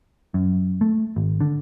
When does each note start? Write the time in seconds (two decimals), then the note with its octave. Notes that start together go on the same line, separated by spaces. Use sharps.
0.34 F#2
0.81 A3
1.16 G#1
1.40 D3